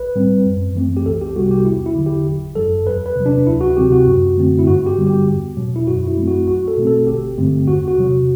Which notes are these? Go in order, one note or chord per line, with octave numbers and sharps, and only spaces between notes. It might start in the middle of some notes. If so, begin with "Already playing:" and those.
Already playing: B1 B4
A2 G3 C4
F#2
E3 A3 C4
G4
C2 A4
G4
C3 G3 B3 F#4
G4
E2 E4
E4
D3 F#3
G4
G1
F#2 F#3 A4
E2 B4
B4
C3 F#3
D4
D2 E4
F#4
C3 F#3 C4 G4
F#4
F#2
D3 A3 C4
E4
G2 F#4
G4
D3 G3 B3
G4
E2
B2 F#3
E4
F#2 F#4
E4
F#3 A3 C4
F#4
B1 F#4
A4
B2 A3 C4
A4
G1 G4
G2 D3 A3 C4
E2 F#4
F#4
C3 F#3